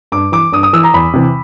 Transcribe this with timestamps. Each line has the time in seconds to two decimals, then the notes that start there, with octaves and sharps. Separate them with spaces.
0.12 G2 D6
0.32 E3 D6
0.52 G2 D#6
0.63 D#6
0.73 E3 E6
0.83 A#5
0.94 E2 B5
1.14 C3 E3